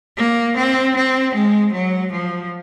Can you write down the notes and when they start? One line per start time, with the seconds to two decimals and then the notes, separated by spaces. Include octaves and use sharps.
0.17 A#3
0.56 C4
0.95 C4
1.34 G#3
1.72 F#3
2.12 F3